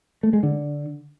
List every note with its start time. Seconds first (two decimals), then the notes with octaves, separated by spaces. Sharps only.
0.23 A3
0.33 G#3
0.43 D3